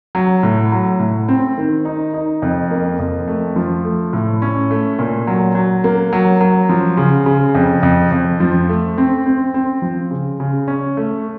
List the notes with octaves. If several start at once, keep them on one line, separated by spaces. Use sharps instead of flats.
F#3
A2
F#3
A2
C4
D#3
D#4
D#4
F2
A#3
F2
A3
F3
A3
A2
C#4
A3
A#2
F#3
F#3
A#3
F#3
F#3
F3
C#3
C#3
F2
F2
F2
F3
A3
C4
C4
C4
F3
C#3
C#3
C#4
A3